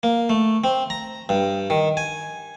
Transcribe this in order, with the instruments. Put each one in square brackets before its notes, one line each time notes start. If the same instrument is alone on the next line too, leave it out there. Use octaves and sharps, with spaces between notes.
[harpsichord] A#3
A3
C4
A#5
G2
D#3
G#5